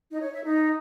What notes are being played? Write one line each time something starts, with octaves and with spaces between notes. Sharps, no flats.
D#4
C#5
E5
D#4